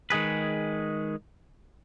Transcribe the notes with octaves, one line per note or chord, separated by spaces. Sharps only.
D#3 G#3 G#4 B4